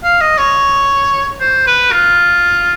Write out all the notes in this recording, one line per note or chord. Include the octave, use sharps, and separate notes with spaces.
F5
D#5
C#5
C5
B4
F4